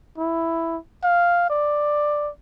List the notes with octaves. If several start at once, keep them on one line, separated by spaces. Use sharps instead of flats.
E4
F5
D5